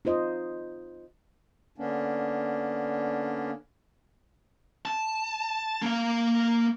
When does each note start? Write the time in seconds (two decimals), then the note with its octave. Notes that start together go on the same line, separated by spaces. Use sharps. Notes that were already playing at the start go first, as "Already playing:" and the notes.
0.05 D#4 F4 C5 D#5
1.78 D3 A#3 B3 C#4 D4
4.86 A5
5.82 A#3 F5